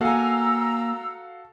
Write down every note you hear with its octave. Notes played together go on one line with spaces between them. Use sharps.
A#3 F#4 A4 F5 G#5 A#5 E6